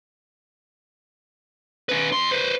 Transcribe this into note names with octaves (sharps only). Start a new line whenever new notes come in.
C#4 B4
F2 C6
B4 C5